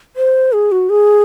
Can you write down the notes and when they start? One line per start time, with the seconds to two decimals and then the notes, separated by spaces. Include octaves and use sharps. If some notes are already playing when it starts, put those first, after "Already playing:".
0.16 C5
0.53 G#4
0.72 F#4
0.90 G#4